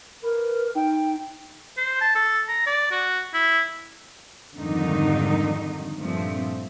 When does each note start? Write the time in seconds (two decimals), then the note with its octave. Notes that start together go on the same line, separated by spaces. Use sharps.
0.23 A#4 B4
0.75 D#4 G5
1.77 C5
2.01 A5
2.15 A4
2.48 A#5
2.67 D5
2.91 F#4
3.34 E4
4.55 F2 G#2 D3 D#3 G3 D#4
5.98 G2 A#2 F3 A3 C4